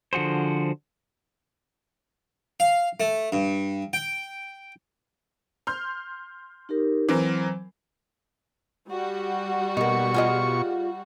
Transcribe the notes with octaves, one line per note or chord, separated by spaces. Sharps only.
D3 F3 F#4 G#4 C5
F5
A3
G2
G5
C6 F6 G6
D#4 G4 A#4
E3 F#3 C4 A#4
G3 F#4
B2 A#3 D#4 C#6
F4 G#4 D#5